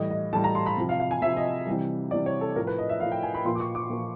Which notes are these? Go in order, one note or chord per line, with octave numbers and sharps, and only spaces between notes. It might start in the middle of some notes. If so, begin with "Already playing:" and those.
Already playing: A2 E3 G3 D#5
D#5
A2 E3 G3 A5
A#5
C6
B5
C3 F3
F5
F5
G#5
C3 F3 E5
D#5
C3 E3 G3
C3 E3 G3 D5
C#5
A4
A2 F3 A#4
B4
D#5
E5
A2 F3 F5
G5
G#5
B5
A#2 F3 C6
D6
C#6
D6
A#2 F3